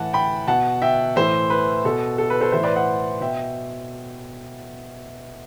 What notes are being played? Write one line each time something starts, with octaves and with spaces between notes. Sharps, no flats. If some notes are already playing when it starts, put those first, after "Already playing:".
Already playing: A2 E3 F#5 A5
G5 B5
B2 F#5 A5
E5 G5
A2 E3 C5 E5
B4
B2 A4
A4
B4
A4 C5
A2 E3 C5 E5
B4 D5
D5 F#5
B2 E5 G5